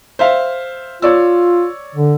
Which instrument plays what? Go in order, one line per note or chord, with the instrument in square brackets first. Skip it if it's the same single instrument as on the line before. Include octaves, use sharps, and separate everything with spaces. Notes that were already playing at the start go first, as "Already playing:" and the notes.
[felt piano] C5 E5 F5
[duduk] F4 [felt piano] C#5 D5 E6
[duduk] D3